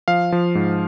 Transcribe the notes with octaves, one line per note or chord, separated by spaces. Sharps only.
F3 F5
F3
G#2